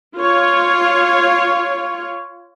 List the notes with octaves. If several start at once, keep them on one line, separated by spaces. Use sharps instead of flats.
F4 C#5